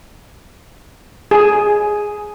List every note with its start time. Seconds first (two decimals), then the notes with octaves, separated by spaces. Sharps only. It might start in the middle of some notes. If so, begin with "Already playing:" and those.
1.31 G#4